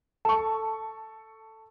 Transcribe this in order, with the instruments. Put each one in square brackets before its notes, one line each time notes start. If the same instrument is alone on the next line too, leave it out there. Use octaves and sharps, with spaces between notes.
[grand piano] A4 C#6 [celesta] A5